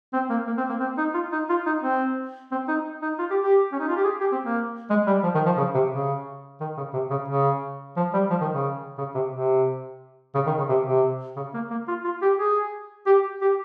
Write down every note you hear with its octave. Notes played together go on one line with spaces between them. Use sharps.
C4
A#3
A#3
C4
A#3
C4
D#4
F4
D#4
F4
D#4
C4
C4
D#4
D#4
F4
G4
G4
C#4
D#4
F4
G4
G#4
G4
C4
A#3
G#3
G3
F3
D#3
F3
C#3
C3
C#3
D#3
C#3
C3
C#3
C#3
F3
G3
F3
D#3
C#3
C#3
C3
C3
C#3
D#3
C#3
C3
C3
C#3
A#3
A#3
F4
F4
G4
G#4
G4
G4